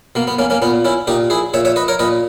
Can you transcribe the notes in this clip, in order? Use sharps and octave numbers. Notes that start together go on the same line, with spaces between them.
B2 A#3
B3
A#3 C#4
A#3 C#4
A#2 B3
C#4 E4
A#2 D#4 G4
E4 G#4
A#2 C#5 E5
C#5 E5
B4 D#5
A#4 C#5
A#2 B4 D#5